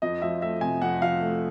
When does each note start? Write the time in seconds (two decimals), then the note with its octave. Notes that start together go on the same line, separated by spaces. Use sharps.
0.02 F2 D#5
0.22 F3 E5
0.42 A3 E5
0.61 C3 G#5
0.82 F2 F#5
1.01 F3 F5
1.21 A3